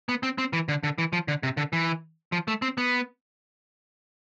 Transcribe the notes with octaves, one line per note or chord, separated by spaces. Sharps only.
B3
C4
C4
E3
D3
D3
E3
F3
D3
C3
D3
E3
F3
A3
C4
B3